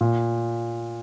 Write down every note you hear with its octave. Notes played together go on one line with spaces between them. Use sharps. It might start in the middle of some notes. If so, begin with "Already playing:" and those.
A#2